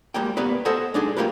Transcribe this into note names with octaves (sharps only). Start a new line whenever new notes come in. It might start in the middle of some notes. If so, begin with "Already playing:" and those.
G3 G#3 A#3 G5
A#3 B3 G4 B4 D5
A4 C5 D#5 F#5 G#5
G#3 D4 D#4 G#4
A#3 F4 G4 A#4 B4